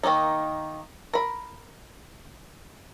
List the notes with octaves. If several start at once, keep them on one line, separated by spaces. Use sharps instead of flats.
D#3 G3 A#3 D#4
A#4 B5